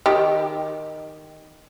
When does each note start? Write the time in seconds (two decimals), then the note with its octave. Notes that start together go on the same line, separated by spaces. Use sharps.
0.06 D#3 G4